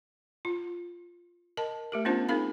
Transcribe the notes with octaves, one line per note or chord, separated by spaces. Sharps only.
F4
A#4 D#5 A5
A3 G4 A#4
B3 C#4 D4 F4 C5 A5
C4 D#4 G#4 A#4 F5 B5